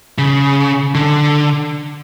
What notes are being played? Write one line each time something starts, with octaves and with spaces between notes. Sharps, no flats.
C#3
D3